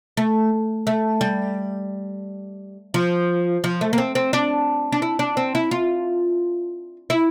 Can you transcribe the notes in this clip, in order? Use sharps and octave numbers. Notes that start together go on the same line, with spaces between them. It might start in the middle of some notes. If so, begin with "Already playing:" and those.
A3
A3
G3
F3
F3
A3
A#3
C4
C4
D4
D4
E4
D4
C4
E4
F4
E4